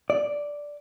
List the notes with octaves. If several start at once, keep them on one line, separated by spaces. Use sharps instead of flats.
D5